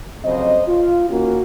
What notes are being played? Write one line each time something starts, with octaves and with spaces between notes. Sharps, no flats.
F2 C#3 F#3 C4 C5 D#5
F4
D#3 A#3 C#4 F#4